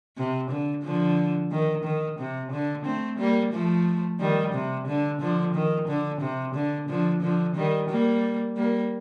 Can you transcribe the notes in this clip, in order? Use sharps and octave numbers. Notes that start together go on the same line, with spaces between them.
C3
D3
D3 F3
D#3
D#3
C3
D3
A3 C4
G3 A#3
F3 A3
D#3 G3
C3
D3
D3 F3
D#3
D3
C3
D3
D3 F3
D3 F3
D#3 G3
G3 A#3
G3 A#3